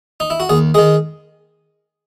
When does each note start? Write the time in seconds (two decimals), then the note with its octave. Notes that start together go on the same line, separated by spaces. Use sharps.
0.20 D#4
0.30 E4
0.40 F#4
0.49 D#2 G#4
0.74 D#3 G#3 G#4